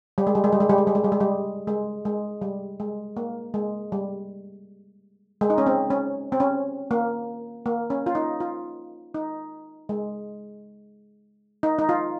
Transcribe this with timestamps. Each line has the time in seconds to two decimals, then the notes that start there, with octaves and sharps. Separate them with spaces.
0.18 G3
0.27 G#3
0.35 G3
0.44 G#3
0.52 G3
0.60 G#3
0.70 G3
0.78 G#3
0.87 G3
0.95 G#3
1.04 G3
1.12 G#3
1.20 G3
1.67 G#3
2.05 G#3
2.42 G3
2.80 G#3
3.17 A#3
3.54 G#3
3.92 G3
5.41 G#3
5.50 D#4
5.58 C#4
5.66 C4
5.90 C#4
6.32 C4
6.40 C#4
6.91 A#3
7.66 A#3
7.90 C#4
8.06 F4
8.15 D#4
8.40 F4
9.14 D#4
9.89 G#3
11.63 D#4
11.79 D#4
11.89 F4